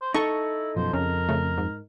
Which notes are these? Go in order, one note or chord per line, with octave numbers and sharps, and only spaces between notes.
C5
D#4 E4 A4 C#6
F#2 B2 F3 C5
F2 C#3 A#4
C#3 A3
G#2